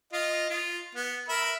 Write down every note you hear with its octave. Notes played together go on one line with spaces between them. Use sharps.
F4 D#5 F5
F4
B3
A#4 E5 B5